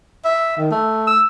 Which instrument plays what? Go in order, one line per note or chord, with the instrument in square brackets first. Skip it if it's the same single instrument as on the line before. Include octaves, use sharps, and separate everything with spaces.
[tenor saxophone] E5
D#3
A3
[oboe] E6